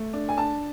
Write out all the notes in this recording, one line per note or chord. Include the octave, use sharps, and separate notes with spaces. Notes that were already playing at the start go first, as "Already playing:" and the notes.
Already playing: A3
D4
G#5
D4 A5